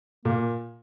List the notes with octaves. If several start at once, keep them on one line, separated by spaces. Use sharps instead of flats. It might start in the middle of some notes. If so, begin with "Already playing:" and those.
A#2 A#3